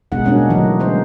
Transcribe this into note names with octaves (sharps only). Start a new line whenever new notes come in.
B2 G#3 D#4 G#4 F#5
G3 A#3 C#4 D4 F#4 C#5
D3 E3 F#3 A3 D#4
G#3 C#4 C5